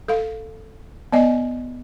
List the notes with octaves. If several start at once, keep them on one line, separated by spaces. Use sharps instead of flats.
A4 F5
B3 D5 D#5 G#5